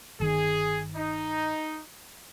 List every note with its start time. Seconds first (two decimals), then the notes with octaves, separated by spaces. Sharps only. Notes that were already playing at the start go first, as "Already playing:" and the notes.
0.20 G1 D#3 G#4
0.95 D#4